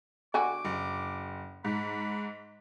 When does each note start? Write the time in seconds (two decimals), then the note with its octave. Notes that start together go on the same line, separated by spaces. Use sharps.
0.34 D3 F#4 G#5 D6
0.65 F#1
1.64 G#2 B5